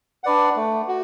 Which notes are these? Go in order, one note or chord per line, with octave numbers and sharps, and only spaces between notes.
D4 B4 D5 F#5
A3
F#4